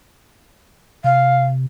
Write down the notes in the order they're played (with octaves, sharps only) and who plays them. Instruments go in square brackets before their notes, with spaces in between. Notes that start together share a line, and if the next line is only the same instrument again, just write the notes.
[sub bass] C3 [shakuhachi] F5